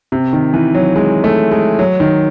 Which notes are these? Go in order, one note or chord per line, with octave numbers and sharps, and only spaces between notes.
C3
D#3
E3
F#3
G#3
A3
G#3
F#3
D#3